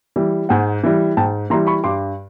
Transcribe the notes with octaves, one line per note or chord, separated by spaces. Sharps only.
E3 G3
G#2 F#5 G#5
E3 G3
G#2 G5 A5
E3 G3 A#5 C6
B5 C#6
G2 C6 D6